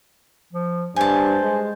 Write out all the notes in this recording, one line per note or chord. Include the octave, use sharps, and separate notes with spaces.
F3
G2 C5 G#5 A5
G#3